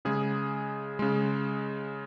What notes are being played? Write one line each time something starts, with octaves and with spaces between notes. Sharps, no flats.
C#3 G#3 G#4
C#3 G#3